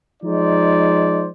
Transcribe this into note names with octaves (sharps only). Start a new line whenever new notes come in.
F3 G#3 D#4 C5 D5